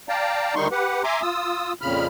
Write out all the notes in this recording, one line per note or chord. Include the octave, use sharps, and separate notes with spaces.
D5 F5 G5 A5 A#5
D2 D#3 G3 D#4 C6 C#6
G4 B4 F#5
E5 G#5 A#5 C6 D6
F4 D#6 E6
F2 A#2 C#3 B5 F6